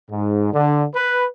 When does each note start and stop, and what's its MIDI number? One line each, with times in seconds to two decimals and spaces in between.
0.10 0.49 44
0.53 0.85 50
0.95 1.24 71